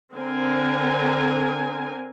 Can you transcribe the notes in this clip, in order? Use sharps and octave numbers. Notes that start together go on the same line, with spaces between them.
D3 C4 A#4 G#5